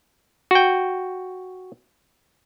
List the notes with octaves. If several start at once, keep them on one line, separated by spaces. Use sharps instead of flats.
F#4 G5